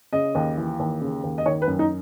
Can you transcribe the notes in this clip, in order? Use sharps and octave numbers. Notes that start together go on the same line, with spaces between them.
C#3 D#5
D#2
E3
D#2
C#3
D#2
D#5
D#3 C#5
B4
F#2
D#4